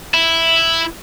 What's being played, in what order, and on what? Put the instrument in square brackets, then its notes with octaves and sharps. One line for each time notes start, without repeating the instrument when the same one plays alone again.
[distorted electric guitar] E4